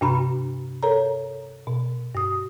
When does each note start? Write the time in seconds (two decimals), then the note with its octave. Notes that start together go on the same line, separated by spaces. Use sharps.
0.01 G2 C3 D4 F#4 A#5 B5
0.83 A4 A#4 C#5 A#5
1.67 B2
2.15 G2 D#6